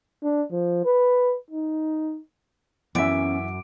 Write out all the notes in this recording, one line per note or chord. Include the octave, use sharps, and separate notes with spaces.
D4
F3
B4
D#4
F#2 E3 B3 C#4 E5 D6 D7